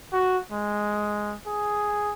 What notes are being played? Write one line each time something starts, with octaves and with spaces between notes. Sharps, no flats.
F#4
G#3
G#4